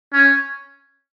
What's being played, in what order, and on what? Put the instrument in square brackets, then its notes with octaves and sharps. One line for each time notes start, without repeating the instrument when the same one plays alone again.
[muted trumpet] C#4